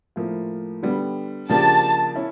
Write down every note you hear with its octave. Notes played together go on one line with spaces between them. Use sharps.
A2 F3 A#3
D3 G3 B3
C#3 F3 A#3 D4 G4 A5
C#4 E4